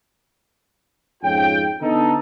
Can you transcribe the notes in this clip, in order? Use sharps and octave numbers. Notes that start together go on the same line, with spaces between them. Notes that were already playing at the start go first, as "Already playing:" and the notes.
F2 G#2 C#4 F4 G5
D3 B3 D#4 A4